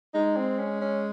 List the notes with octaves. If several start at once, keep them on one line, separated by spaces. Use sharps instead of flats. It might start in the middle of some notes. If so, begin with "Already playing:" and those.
G#3 D#4
C4
C#4
C#4